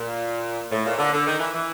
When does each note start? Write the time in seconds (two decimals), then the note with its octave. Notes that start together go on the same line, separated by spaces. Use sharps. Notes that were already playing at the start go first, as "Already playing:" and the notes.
Already playing: A#2
0.71 A2
0.86 A#2
0.98 D3
1.13 D3
1.26 D#3
1.39 E3
1.54 E3